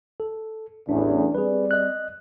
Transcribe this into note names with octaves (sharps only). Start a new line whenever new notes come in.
A4
A1 E2 D4
G3 C4 G#4 B4 D5
D#5 F#6